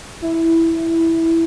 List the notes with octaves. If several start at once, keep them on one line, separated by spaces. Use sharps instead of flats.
E4